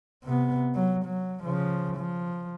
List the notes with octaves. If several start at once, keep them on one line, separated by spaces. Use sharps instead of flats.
C3 B3
F#3
F#3
C#3 F3
F3